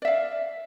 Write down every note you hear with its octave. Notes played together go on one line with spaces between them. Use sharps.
D5 E5 F5